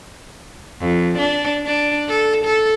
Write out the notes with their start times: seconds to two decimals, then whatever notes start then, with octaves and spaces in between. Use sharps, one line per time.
0.80 F2
1.19 D4
1.66 D4
2.09 A4
2.45 A4